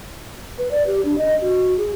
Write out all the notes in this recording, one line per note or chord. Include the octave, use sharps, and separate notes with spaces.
B4
D5
G4
D4
D#5
F#4
G#4